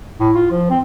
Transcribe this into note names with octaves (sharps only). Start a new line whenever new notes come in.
A2
F4
F3
C4